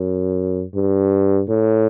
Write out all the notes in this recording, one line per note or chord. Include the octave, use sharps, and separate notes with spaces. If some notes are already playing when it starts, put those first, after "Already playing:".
Already playing: F#2
G2
A2